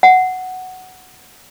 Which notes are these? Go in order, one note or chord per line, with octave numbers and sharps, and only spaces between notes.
F#5